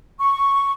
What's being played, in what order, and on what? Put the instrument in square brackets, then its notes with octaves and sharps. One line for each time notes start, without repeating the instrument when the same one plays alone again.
[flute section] C#6